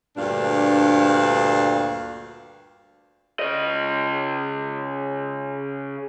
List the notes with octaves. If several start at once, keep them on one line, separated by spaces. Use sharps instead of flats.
D2 G2 A#2 D4 F5
C#3 D#5